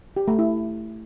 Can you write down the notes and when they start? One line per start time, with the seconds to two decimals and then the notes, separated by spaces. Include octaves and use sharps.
0.17 G4
0.28 A3
0.39 E4